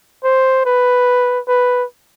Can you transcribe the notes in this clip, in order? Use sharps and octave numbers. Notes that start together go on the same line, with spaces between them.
C5
B4
B4